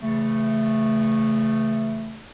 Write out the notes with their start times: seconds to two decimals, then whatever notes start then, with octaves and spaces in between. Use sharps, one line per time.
0.01 C#3 E3 A3